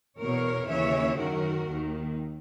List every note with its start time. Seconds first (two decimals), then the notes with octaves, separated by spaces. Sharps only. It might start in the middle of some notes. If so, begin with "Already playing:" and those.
0.19 E2 B2 A#4 C#5
0.68 D#2 C#3 E3 C#5 E5
1.18 F#2 D#3 F#4 A#4
1.68 D#2 D#3